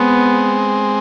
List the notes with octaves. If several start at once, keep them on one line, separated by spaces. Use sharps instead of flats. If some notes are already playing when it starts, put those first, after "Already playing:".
Already playing: G#3 B3 C4